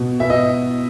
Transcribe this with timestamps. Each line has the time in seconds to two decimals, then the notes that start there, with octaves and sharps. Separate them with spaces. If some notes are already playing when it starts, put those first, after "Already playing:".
Already playing: B2
0.20 B3 E5
0.30 D#5